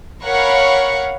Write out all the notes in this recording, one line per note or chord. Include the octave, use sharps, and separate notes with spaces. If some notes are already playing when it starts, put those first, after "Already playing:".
A#4 C#5 F5 F#5 B5 C#6